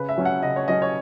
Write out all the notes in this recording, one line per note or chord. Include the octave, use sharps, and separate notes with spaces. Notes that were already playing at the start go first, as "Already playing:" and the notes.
Already playing: C#3 B4
E5
F#3 C#4
F#5
C#3 D#5
C#5
F#3 C#4 D#5
C#5